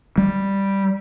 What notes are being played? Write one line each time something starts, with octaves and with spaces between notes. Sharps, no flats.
G3